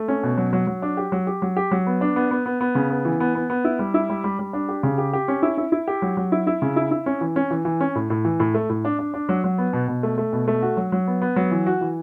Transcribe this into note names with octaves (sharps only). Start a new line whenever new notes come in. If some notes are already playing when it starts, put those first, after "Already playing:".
Already playing: A3
C#4
B2
F#3
F#3
F#3
D4
G4
F#3
G4
F#3
G4
F#3
B3
D4
B3
B3
B3
B3
C#3
B3
E3
B3
B3
B3
E4
G3
E4
G3
G3
G3
D4
G4
C#3
G4
G4
C#4
E4
E4
E4
G4
F#3
F#3
E4
E4
C#3
E4
E4
C#4
E3
C#4
E3
E3
C#4
A2
A2
E3
A2
A3
A2
D4
D4
D4
F#3
F#3
B3
B2
B2
A3
A3
B2
A3
F#4
F#3
F#3
B3
B3
F#3
E3
F#4
E3